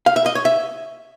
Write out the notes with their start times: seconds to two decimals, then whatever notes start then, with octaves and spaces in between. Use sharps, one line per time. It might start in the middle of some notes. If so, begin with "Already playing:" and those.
0.06 F5
0.16 E5
0.26 D#5
0.35 C#5
0.45 E5